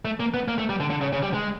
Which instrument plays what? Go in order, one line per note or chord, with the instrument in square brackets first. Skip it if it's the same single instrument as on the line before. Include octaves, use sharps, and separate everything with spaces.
[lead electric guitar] A3
A#3
B3
A#3
A3
G3
D3
D3
C#3
C#3
G3
G#3